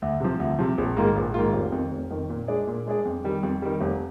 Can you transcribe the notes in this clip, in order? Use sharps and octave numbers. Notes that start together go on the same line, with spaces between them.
D2
C3 F3
D2
C3 F3
A#1
G#2 D#3 A#3 F4
A#1
G#2 D#3 A#3 F4
F1
F2 D#3
F1
F2 D#3
A#2
G#3 D4 G#4 D5
A#2
G#3 D4 G#4 D5
F2
D#3 G3
F2
D#3 G3
F1